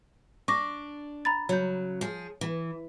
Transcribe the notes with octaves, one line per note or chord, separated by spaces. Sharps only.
D4 C#6 D6 A#6
A#5 B5 A6
C#3 F#3 C#5 G6
F3 G#4
E3